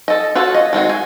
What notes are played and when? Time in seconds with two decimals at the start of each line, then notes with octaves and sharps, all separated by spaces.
0.08 A4 D#5
0.35 F4 F#4 A4 C#5
0.54 D#5
0.73 D#3 G#3 C4 F#4
0.89 G#5